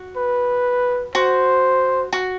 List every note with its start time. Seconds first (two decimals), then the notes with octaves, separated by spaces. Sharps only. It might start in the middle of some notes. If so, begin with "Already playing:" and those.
Already playing: F#4
0.16 B4
1.15 F#4 C5
2.13 F#4